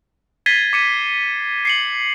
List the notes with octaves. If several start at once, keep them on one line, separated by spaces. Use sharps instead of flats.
G#6 A6 B6 C7 D#7 G7
D6 C#7 D#7
C7 C#7 F#7